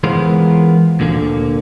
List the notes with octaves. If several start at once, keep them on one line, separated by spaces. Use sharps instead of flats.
E3 G#3 B3 F4 A#4 C5
D2 A#2 D3 A#3